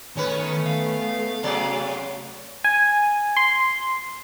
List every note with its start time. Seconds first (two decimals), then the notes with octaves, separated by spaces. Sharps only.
0.17 D#3 A3 B3 C#4 B4
0.66 F5
1.43 C3 F#3 D5
2.64 G#5
3.37 C6